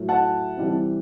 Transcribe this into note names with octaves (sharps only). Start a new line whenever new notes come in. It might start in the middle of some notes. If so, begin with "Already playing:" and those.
Already playing: A2 F#3 A3
F#5 A5
C3 E3 G3 C4